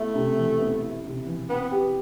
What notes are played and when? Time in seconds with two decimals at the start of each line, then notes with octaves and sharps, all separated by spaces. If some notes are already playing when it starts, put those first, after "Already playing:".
Already playing: A3 B3 E4
0.15 C3
0.38 E3
0.60 B3
0.82 E4
1.04 C3
1.26 E3
1.49 B3 C4
1.71 G4